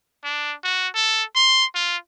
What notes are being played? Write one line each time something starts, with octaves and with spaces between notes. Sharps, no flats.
D4
F#4
A4
C6
F4